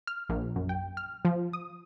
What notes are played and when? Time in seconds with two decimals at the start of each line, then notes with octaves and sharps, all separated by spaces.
0.07 F6
0.29 A#1
0.56 F#2
0.69 G5
0.97 F6
1.25 F3
1.53 D#6